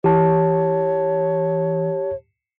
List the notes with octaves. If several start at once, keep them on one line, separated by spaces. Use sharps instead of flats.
E3 G4 C#5 A5